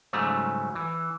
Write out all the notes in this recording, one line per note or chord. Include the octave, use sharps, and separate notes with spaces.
G#2 C#3 F#3 G3 A3
E3